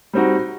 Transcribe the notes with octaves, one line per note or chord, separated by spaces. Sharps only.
G3 C4 D#4 F#4